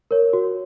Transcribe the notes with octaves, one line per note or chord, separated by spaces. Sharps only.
A#4 C#5
F#4